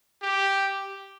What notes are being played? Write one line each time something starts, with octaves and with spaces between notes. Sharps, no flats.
G4